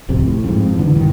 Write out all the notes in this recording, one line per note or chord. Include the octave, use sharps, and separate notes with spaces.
D1 C2 F2 C3
A2
F2 G#2
D3 E3
B1 G2 D#3